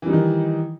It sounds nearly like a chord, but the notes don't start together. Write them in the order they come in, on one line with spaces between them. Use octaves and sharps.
E3 G3 D#4 D#3